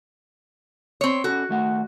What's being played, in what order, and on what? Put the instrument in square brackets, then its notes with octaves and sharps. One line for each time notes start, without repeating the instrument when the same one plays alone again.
[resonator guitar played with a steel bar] C4 C#5
[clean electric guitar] C#4 A4 [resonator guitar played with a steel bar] F#4
[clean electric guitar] D#2 A3 F#5